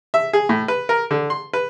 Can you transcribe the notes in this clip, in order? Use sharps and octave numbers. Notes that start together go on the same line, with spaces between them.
E5
G#4
A2
B4
A#4
D3
C6
B4